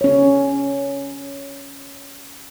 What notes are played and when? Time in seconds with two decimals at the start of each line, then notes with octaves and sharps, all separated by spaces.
0.01 C#4 C#5